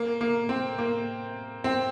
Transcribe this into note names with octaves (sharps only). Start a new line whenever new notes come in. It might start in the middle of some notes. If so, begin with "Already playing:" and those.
Already playing: A#3
A#3
C4
A#3
C4